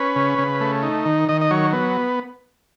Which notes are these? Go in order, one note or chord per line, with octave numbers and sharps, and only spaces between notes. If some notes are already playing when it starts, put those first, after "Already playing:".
Already playing: C#4 B4
C#3
C#3
A3
D#4
D#3
D#3 D#5
D#5
F#3 C#5
B3